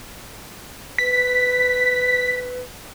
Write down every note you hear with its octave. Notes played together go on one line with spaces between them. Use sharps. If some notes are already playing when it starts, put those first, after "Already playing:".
B4 B6